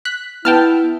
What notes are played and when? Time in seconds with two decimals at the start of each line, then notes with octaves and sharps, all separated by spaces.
0.05 F#6 B6
0.45 B3 E4 G5 A5 F6